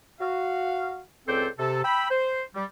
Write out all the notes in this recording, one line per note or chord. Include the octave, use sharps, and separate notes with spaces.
F#4 F5
C#2 C4 A4 C5 D5 G5
C3 A4
G5 B5 E6
C5
G3